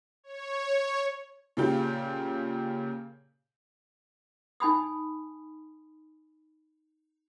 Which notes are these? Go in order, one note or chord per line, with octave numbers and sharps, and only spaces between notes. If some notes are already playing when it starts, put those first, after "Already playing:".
C#5
C#5
A#2 C#3 G4
D#4 G#5 B5 D#6